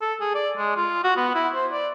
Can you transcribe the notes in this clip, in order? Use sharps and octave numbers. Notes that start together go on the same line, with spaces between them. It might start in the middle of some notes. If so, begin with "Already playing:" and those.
A4
G#4
D5
G#3
F4
F#4
B3
E4
C5
D5